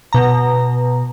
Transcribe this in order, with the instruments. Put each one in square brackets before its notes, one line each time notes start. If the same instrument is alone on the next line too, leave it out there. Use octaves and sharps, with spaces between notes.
[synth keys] B2 A#5